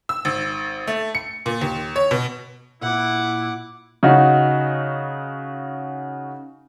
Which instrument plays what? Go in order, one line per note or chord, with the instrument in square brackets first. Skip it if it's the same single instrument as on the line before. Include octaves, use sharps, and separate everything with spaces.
[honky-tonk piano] E6
G#1
A3
C#7
A#2
D#2
C#5
B2
[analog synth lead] A#2 [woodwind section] E4 [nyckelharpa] F#5 D6
[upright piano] C#3 D#4 F#4